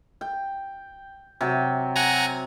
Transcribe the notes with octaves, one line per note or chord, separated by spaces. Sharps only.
G5
C3 F#3 G5
F#5 G#5 A#5